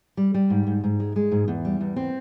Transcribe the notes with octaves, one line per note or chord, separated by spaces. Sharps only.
G3
G3
G#2
G#2
G#2
G#3
G#3
G#2
E2
G3
E2
C4